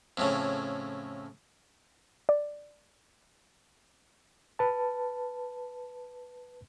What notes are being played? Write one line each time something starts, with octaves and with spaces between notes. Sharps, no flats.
F2 A2 C#3
D5
B4 A5